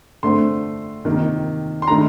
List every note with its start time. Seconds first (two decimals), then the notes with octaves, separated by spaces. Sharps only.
0.23 D3 A3 C4 C6
1.05 C3 D#3 A#3
1.82 C6
1.87 D#3 A3 D4 A#5